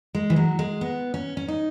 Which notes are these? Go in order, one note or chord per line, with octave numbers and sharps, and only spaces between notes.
G#3
E3
F#3
G#3
B3
C#4
C#4
D#4